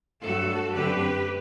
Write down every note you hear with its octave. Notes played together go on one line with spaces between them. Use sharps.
G2 F#3 A3 F#4 A4
F#2 D3 A3 C4 G4 B4